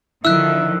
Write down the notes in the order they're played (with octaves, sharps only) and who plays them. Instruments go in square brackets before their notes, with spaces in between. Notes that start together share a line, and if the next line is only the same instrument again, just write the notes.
[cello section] D3 D#3 F3 [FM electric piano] E4 [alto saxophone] E5 [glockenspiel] E6 F#6